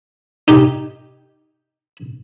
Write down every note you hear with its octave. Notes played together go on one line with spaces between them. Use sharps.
D#4 G4